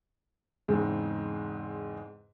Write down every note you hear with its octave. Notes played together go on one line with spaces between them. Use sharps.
E2 G#2 C#3 G#3 C4 D#4